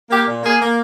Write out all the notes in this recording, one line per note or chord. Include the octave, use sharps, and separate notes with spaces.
A#3 G4
A#2
A#3 G#4
A#3